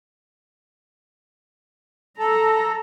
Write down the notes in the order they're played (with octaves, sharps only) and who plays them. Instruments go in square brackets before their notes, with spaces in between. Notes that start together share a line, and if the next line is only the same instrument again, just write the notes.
[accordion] A4 [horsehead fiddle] A#5